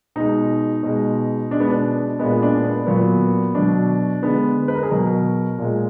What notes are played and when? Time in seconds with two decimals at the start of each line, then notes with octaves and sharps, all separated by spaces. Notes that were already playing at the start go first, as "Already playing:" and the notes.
0.16 B2 G#3 D#4
0.83 B2 G#3
1.51 B2 G#3 D4
1.60 B3
1.69 D4
2.19 A#2 G#3 B3
2.42 D4
2.64 B3
2.87 A#2 F#3 B3
3.55 B2 F#3 D4
4.22 D3 G#3 B3
4.68 B4
4.75 A#4
4.83 G#4
4.90 B2 F#3 A#4
5.58 A#2 G#3